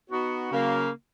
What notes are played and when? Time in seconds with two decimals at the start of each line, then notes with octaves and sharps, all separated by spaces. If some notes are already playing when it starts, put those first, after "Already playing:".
0.10 B3 D#4 F#4
0.50 C#3 F#3 A#3